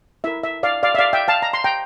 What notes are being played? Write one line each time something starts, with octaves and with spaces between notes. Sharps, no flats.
E4 A#4 E5
E5
D5 F5
D5 F5
E5
D5 F5
E5 G5
F5 A5
A#5
C6
G5 A#5